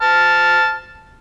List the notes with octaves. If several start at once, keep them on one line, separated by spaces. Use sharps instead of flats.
A5 F6